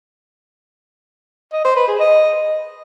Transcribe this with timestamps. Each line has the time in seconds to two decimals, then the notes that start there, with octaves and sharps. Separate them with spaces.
1.53 D#5
1.64 C5
1.76 B4
1.88 G#4
1.99 D#5